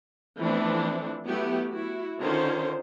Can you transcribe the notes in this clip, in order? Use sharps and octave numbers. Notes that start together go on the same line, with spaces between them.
E3 F3 A3 B3 C4 D4
F#3 A3 B3 E4 G4
E4 F#4
D3 D#3 C#4 F4 C5